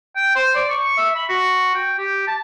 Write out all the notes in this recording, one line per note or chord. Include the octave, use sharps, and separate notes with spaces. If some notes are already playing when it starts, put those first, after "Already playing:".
G5
C5
D5
C#6
E5
B5
F#4
G5
G4
A5